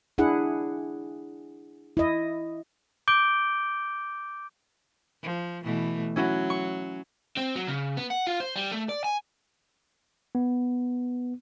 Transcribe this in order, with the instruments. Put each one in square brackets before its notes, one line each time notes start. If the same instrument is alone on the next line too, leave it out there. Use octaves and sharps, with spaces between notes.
[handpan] D4 E4 G#4 F#5
E4 D#5
[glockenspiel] D6 G6 D7 G7
[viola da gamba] F3
B2 E3 A3
[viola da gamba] F#3 [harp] C#4 E4 F#4
[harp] C#6
[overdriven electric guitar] C4
F#3
C#3
B3
F#5
F4
C5
G3
A3
D5
G#5
[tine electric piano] B3